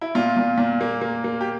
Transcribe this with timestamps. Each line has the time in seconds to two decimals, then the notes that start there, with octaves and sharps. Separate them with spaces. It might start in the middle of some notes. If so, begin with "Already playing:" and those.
0.01 E4
0.15 A#2 F4
0.37 A#2
0.58 A#2
0.81 A#3
1.02 A#3
1.24 A#3
1.41 G4